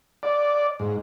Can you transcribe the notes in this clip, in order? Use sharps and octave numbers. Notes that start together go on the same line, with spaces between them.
D5
G#2